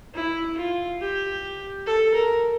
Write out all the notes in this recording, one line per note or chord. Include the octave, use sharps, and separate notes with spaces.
E4
F4
G4
A4
A#4